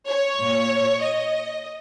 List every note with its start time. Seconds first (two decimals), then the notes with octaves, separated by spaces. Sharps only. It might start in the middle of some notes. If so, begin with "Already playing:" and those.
0.09 C#5
0.40 A#2
1.01 D#5